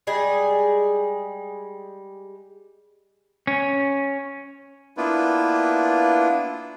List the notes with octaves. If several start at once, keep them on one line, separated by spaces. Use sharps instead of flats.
G3 G#3 G#4
C#4
A#3 B3 D4 E4 F4 B4